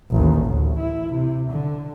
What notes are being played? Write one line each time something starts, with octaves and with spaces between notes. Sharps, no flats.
A1 D#2
D2
E4
C3
D3